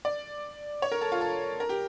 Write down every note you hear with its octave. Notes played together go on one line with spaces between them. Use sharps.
D5
C#5
A#4
A4
F4
A4
A#4
G4